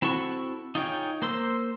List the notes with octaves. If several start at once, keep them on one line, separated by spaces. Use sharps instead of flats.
C4 E4 F#4 A4 C#6
D#4 F4 G#4 C#5 G5
A#3 C5 C6 E6